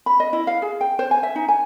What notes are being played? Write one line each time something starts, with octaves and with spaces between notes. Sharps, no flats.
B5
D#5
E4
F5
G#4
G5
C5
G#5
E5
D#4
G#5